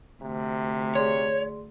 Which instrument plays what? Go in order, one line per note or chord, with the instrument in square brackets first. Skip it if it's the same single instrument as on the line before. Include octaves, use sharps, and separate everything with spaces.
[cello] D2 [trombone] C3
[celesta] G#4 D5 C6 [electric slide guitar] C#5